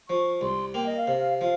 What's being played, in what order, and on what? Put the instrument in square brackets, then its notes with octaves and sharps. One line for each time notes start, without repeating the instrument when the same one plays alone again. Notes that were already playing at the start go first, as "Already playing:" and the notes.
[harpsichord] F3 [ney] C#6
[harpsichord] C2 [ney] C6
[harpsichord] A#3 [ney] G5
[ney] D#5
F5
[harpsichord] C3
[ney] F5
[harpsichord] F3 [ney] F5